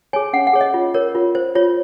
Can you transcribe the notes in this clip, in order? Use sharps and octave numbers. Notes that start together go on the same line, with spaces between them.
G#4 C#5 G#5
C#4 F#5
F#5
G#4 C#5
D#5
F4
A#4 C#5
F4
C5
F4 C#5